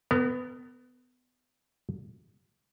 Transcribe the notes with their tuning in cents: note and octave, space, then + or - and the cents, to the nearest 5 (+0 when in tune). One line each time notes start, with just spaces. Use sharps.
B3 +20 A#4 -30